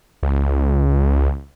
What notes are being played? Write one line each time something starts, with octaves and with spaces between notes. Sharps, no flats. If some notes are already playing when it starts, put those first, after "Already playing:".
C#2